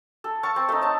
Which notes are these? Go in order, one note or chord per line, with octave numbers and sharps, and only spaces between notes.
A4
F5 A5 C#6
C4
A3 D#4
C#5 A5